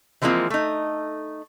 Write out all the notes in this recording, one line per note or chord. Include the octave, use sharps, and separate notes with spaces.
E3 F3 G#3 A#3 C4 F4
A3 D#4